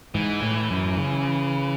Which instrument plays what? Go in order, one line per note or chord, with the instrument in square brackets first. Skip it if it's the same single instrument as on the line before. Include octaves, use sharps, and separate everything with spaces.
[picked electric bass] G#2 [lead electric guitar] E3
[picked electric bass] A2
F#2
C#3